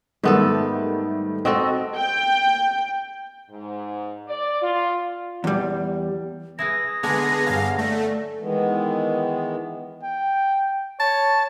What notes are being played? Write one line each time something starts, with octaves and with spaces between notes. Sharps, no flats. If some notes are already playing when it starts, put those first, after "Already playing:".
G#2 D#3 G3 A3 B3 A4
C4 F#4 A4 D#5
G5
G#2
D5
F4
E2 G3
E4 G#4 B4 D#6 A#6
D3 G#3 B3 G#4
G2 F#3 F5 F#5 G#5
A3 A4 D5
D#3 E3 G#3 B3
G5
C#5 A5